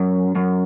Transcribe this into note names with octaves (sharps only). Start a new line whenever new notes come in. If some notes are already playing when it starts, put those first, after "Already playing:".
Already playing: F#2
F#2